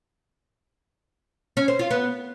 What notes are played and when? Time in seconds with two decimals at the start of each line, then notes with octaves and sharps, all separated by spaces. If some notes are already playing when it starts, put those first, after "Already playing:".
1.57 C#4
1.68 C5
1.79 F4
1.91 B3